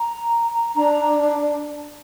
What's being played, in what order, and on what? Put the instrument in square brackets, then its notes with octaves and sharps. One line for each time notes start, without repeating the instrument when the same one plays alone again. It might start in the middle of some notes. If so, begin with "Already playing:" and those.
Already playing: [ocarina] A#5
A#5
[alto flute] D4 [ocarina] A#5